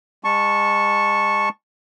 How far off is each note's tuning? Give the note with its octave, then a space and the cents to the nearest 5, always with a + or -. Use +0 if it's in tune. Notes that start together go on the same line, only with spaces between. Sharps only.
G#3 -30 A5 +0 C#6 -10